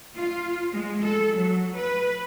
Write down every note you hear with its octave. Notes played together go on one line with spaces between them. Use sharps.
F4
G#3
A4
F#3
B4